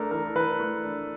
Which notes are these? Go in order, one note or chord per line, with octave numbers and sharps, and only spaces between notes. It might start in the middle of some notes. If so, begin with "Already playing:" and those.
Already playing: A3 D4 A4 A#4
E3 A#4
E3 B4
A3
D4